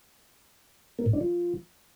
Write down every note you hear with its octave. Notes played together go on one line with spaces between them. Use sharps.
A#3
A2
D4
F3